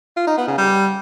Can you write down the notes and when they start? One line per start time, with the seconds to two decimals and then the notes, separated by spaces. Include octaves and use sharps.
0.17 F4
0.27 D#4
0.37 B3
0.48 C#3
0.58 G3